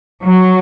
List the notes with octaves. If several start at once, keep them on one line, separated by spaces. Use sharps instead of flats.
F#3